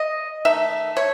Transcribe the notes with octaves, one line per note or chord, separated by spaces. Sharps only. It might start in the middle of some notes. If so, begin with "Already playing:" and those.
Already playing: D#5
D#3 A3 E5
C#5